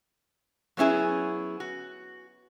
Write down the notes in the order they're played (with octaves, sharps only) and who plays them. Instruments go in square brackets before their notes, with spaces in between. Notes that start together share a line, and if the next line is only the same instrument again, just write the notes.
[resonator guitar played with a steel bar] F#3 B3 C#4 E4 G#4
F#4